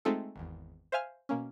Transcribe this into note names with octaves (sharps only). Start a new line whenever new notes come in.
G#3 A3 C4 D#4 F4 A4
G#1 E2
C5 E5 F5 G#5 F6
B2 A#3 C#4